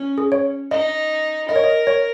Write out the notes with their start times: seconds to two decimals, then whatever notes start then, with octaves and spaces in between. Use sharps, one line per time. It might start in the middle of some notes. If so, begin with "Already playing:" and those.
Already playing: C#4
0.18 G#4
0.32 C#5
0.71 D#4 D#5
1.49 A#4 D#5
1.56 C#5
1.64 D#5
1.87 C#5